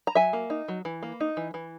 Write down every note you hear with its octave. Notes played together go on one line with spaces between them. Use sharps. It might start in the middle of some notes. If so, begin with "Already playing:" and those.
A#5
F#3 E5 G#5
A#3
D#4
F#3
E3
A#3
D#4
E3
E3